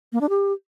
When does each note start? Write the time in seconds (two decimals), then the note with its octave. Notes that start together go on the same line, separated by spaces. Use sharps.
0.13 A#3
0.21 D4
0.30 G4